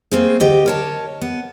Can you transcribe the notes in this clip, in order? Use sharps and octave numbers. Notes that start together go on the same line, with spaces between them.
A3 A#3 C4 G#4
D2 G4 D#5
A#4 C#5 A5
B3